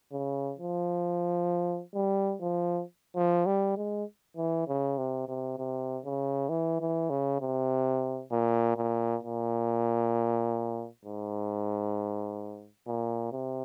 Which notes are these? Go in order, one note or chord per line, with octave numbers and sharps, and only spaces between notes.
C#3
F3
G3
F3
F3
G3
G#3
E3
C#3
C3
C3
C3
C#3
E3
E3
C#3
C3
A#2
A#2
A#2
G#2
A#2
C3